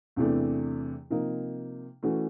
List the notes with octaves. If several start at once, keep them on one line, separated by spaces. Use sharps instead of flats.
E2 C3 E3 A3 D4
C3 F3 A#3 D#4
E3 A3 C#4 F#4